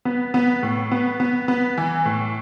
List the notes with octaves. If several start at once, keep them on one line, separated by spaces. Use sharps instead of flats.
B3
B3
A2
B3
B3
B3
E3
A2